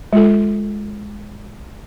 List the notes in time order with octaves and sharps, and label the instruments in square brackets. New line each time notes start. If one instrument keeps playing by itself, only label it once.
[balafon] G#3 F4 A4